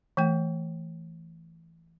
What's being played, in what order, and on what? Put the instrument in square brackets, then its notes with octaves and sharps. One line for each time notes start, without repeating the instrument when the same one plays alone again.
[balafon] E3 A3 G5